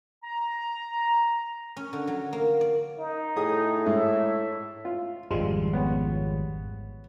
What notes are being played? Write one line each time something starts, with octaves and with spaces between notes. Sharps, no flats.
A#5
C#4
D3
F#3
A#3
D5
D#4
A2 G#4 D#6
G#2 E5
F4
G#1 F2 F3 G3 G#3 F4 C6
B3 C#5 F#5